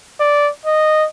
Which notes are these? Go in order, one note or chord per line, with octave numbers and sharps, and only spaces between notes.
D5
D#5